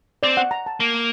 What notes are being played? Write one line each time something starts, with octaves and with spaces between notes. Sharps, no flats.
C4 D5
F#5
A#5
A5
A#3